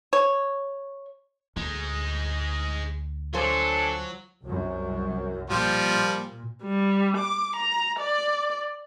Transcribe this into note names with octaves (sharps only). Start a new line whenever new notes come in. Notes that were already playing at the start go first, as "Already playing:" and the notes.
C#5
D2 G#3 D#4
F#3 D4 F4 A4 C5 G#5
C2 F#2
A#2 F3 G3
G3
D6
A#5
D5